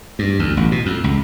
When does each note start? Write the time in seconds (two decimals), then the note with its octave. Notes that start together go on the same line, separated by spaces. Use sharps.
0.19 G2
0.39 D2
0.57 A1
0.72 B2
0.86 F2
1.04 C#2